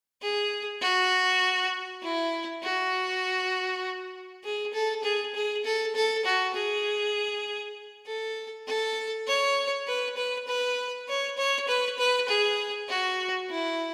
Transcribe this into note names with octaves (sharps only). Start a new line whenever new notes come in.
G#4
F#4
E4
F#4
G#4
A4
G#4
G#4
A4
A4
F#4
G#4
A4
A4
C#5
B4
B4
B4
C#5
C#5
B4
B4
G#4
F#4
E4